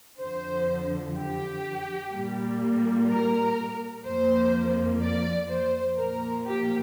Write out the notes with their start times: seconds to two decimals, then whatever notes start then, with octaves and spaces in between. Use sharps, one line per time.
0.19 F2 D3 F3 C5
1.15 G4
2.12 A#2 G3 A#3
3.08 A#4
4.04 F2 F3 A#3 C5
5.01 D5
5.49 C5
5.97 A#2 F3 A#3 A#4
6.45 G4